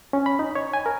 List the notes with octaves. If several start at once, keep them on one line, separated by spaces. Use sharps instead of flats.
C#4
B5
D#4
C#5
G#5
A#4